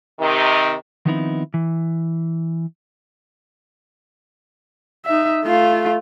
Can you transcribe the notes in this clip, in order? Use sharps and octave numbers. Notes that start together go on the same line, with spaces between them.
C3 D#3
D#3 F3 B3 C4 D#4 E4
E3
D#4 E5
A3 F4